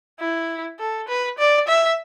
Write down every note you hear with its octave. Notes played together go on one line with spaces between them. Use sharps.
E4
A4
B4
D5
E5